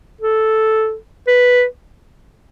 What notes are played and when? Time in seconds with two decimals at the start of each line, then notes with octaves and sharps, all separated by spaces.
0.21 A4
1.27 B4